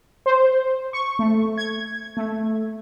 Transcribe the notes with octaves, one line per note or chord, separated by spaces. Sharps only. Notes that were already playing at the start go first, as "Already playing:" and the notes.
C5
C#6
A3
G#6
A3